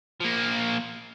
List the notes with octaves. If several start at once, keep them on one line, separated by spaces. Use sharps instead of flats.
F3 A#3